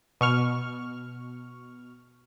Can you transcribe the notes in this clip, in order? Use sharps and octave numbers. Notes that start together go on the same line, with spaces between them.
B2 C#6 F6